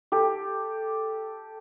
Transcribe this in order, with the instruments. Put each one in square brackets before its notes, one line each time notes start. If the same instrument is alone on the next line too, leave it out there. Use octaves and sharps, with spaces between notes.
[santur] G4 A4